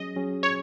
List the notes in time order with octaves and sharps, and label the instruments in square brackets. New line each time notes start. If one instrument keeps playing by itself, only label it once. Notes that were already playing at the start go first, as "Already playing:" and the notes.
Already playing: [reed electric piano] F#3 C#4 G#4 [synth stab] D#5
[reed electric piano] F#3 C#4 G#4
[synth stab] C#5